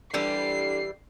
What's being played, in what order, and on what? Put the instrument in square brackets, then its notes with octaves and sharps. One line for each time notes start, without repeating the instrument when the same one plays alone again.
[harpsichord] D3 [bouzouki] E3 G3 G4 [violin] C7